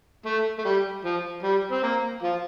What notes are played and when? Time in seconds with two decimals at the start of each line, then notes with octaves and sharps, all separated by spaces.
0.26 A3
0.58 A3
0.65 G3
1.05 F3
1.43 G3
1.72 C4
1.83 A#3
2.23 F3 F4